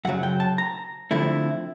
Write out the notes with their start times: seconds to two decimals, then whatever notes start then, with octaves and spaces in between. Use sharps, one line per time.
0.05 F#2 C#3 F#3 F#5
0.23 G5
0.40 A5
0.58 A#5
1.11 D3 F3 A3 C4 E4